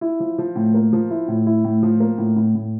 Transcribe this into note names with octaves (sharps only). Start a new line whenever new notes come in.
E4
F3
F3
A2
A#3
F3
E4
A2
E4
A2
F3
A#3
A2
A2
A2